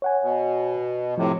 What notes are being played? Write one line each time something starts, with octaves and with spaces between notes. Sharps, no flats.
C#5 F#5 G#5
B2
A2 C3 F3